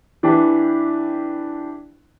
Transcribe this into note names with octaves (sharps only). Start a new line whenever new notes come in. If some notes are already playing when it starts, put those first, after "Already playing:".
E3 D4 E4 G4 B4